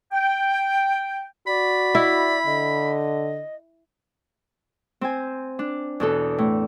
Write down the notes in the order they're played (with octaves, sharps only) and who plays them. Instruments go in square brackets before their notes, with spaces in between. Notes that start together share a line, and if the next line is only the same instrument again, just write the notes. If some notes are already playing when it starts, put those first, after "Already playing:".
[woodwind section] G5
[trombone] F#4 [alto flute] D5 [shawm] B5
[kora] E4
[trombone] D3 [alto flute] D#5
[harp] C4 C5 G#5
D4
E2 B2 A4
A2